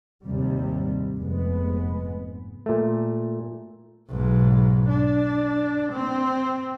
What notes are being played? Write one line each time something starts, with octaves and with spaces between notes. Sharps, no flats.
D#2 G#2 C3 G3
F1 G#2 G#3 B3
A#2 A3
B1 G#2
D4
C4